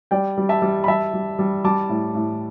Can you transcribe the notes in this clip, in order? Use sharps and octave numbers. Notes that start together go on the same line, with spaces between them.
G3 D5 G5
G3
E5 A5
G3
B5
G3 E5 A5
G3
G3
G3 A5 D6
A2
A2